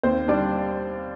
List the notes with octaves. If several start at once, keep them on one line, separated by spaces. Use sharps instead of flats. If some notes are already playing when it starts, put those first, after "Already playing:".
D#2 C4 C5
G3 D4 D5